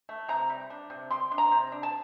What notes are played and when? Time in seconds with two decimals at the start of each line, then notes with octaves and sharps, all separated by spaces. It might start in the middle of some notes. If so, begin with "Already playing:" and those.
0.09 A3
0.28 C3 A#5
0.49 G3
0.70 D4
0.90 C3
1.11 G3 C6
1.31 D4
1.38 A#5
1.51 C3
1.72 D4
1.83 A5